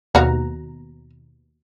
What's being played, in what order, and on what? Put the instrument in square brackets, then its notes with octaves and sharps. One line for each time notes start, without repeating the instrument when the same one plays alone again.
[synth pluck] D#2 B2 A#5 [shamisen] F#4 F5